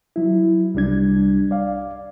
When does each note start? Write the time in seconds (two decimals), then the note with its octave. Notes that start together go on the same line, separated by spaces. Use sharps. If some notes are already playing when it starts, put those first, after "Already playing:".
0.16 F#3 E4
0.74 C2 G3 D4 G#6
1.51 D5 F5